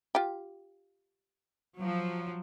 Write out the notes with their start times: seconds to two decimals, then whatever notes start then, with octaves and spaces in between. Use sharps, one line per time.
0.15 F4 G4
1.77 F3 F#3